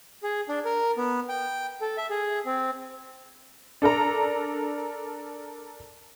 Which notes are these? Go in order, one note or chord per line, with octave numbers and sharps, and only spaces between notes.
G#4
D4
A#4
B3
G5
A4
E5
G#4
C4
D4 A4 A#4 A#5